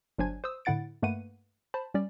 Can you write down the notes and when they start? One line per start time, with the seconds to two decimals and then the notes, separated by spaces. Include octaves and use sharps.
0.18 G1 F#3 D4 C5 G#5 G#6
0.44 C5 D#6 E6
0.65 A2 D3 E4 F#5 A6 D7
1.02 G2 A3 A#3 B4 F#5 D#7
1.74 C5 A5 B5
1.94 G3 C#4 D5